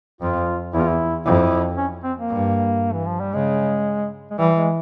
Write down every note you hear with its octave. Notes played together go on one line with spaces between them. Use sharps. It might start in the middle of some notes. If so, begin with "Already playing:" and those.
F2 F4
E2 E4
F4
E4
F2 E4
C#4
C4
A#3
G2
E3
F3
G3
C#3 G#3
G#3
E3 G3
G#3